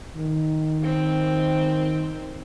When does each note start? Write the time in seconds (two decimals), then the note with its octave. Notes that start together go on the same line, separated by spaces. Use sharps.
0.16 D#3
0.83 C4